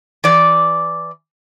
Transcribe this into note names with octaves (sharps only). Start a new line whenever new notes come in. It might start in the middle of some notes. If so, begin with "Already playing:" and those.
E3 D5